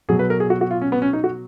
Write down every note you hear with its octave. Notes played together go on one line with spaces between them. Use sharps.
B2 F#3 G#4
B4
A#4
G#4
F#4
F#4
F4
C#4
B3
C#4
D#4
F#4